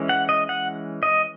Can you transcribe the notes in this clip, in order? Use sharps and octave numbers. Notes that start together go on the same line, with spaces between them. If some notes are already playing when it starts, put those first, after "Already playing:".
Already playing: E3 G#3 C#4
F#5
D#5
F#5
D#5